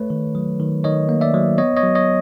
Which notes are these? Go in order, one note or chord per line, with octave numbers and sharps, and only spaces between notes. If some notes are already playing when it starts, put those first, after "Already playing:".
Already playing: A3 B4 C#5
D#3
F#3
D#3
D#3 C#5 D#5
A#3
D5 E5
F#3
B3 C#5 D#5
C#5 D#5
F#3
C#5 D#5